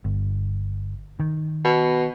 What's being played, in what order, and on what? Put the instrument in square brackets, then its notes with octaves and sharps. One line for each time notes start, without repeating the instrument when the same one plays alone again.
[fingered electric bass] G1
D#3
[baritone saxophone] B2